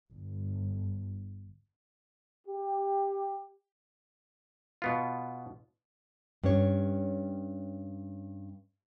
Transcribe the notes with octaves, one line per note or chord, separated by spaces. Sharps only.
G1
G4
B2 B3 F4
G2 C#4 C#5